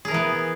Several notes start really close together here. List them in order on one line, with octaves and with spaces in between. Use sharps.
G#4 A#4 E3 B3